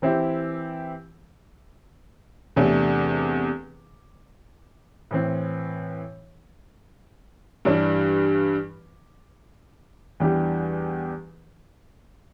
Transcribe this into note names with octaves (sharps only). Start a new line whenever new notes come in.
E3 C4 E4 G4
E2 C3 A3 D4
A2 E3 C4
G2 E3 G3 D4
E2 E3 G3 D4 G4